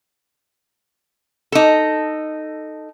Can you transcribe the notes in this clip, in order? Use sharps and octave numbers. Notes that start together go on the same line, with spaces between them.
D#4 A4